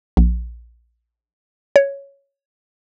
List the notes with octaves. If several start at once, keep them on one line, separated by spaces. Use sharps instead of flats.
A#1
C#5